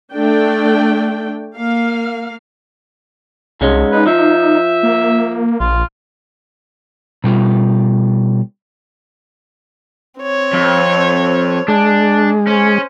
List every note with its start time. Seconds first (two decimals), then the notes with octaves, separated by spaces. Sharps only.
0.13 A3 D4 G5
1.55 A#3 F5
3.61 C2 G#2 G#3 C#4
3.92 D#4 B4
4.07 F3 E5
4.83 A#3
5.60 A#1 F4
7.24 B2 G3 F4
10.21 C4 C#5
10.53 F2
11.68 G#3 D4
12.48 C#4 C5